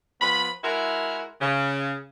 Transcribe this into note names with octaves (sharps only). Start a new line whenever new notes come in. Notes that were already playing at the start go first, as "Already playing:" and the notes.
F3 B3 B5
G#3 E4 F#4 A#4
C#3